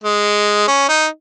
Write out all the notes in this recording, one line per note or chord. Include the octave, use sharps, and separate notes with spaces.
G#3
C#4
D#4